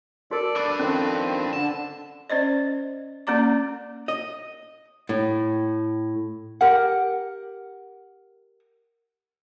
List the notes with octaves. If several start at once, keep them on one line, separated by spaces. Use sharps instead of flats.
F#4 A4 A#4 D5
D4 B4 D6
D#3 F3 C4 C#4 A4
D3 A5
C#4 C5 D5 D#5
A#3 C#4 D5 A#5 D6
D#5
A2
G4 A#4 F#5